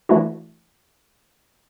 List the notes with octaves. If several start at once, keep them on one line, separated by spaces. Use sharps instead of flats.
E3 A3 D4 E4 F#4